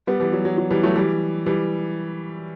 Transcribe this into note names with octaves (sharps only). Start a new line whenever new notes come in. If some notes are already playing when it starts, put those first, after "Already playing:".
G3 B3
E3 G3
F#3
F#3
F#3
E3 G3
F#3 A3
E3 G3
E3 G3